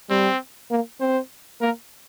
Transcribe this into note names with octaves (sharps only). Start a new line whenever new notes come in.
G3 C4
A#3
C4 C5
A#3 A#4